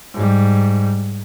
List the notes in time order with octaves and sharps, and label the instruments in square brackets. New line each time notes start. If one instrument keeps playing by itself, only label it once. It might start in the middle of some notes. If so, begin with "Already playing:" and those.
[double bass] G#2 G3